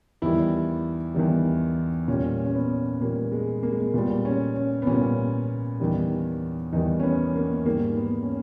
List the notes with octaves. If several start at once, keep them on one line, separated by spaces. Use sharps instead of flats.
E2 D#3 G3 E4
E2 D#3 G3
A#2 G3 C#4
C#4
B3
A#2 G3 A#3
G#3
A#3
G#3
A#3
A#2 G3 B3
C#4
C#4
B3
A#2 G3 C#4
E2 D#3 G3
E2 D#3 G3 D#4
C#4
B3
A#3
G#2 D#3 G3 A#3
B3
C#4